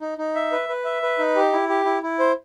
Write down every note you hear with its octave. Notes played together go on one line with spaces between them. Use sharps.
D#4
D#4
E5
B4
B4
E5
B4
D#4
G4
E4
G4
E4
E4
C5